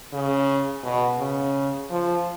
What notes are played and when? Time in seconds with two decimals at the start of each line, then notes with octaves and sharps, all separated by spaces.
0.13 C#3
0.84 B2
1.19 C#3
1.91 F3